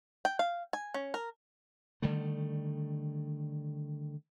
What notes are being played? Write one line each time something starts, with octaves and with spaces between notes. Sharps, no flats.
G5
F5
G#5
C#4
A#4
D3 D#3 G3 A3